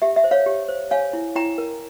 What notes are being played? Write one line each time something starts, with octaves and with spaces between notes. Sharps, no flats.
G4 E5
E5
C5
C#5 F5
G4
C5
C#5 F5 G#5
E4
E4 G5 A#5
A#4